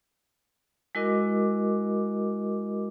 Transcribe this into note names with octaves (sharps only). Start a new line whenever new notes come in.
G#3 E4 F#4 A#4 D#5 D6